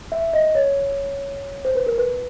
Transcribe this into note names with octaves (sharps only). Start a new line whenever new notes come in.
E5
D#5
C#5
C5
B4
A#4
B4